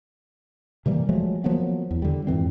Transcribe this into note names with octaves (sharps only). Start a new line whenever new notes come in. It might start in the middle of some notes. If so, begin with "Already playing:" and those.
C3 E3 G3 A#3
F3 F#3 G#3 A3
F3 F#3 A#3 B3
E2
D3 G3
F2 G#2 E3 C4